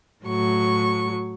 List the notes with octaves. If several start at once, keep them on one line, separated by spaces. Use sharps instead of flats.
A2 F#3 C#6